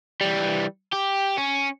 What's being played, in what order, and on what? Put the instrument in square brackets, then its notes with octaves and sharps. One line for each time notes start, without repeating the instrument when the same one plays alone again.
[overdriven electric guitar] E3 G3
G4
C#4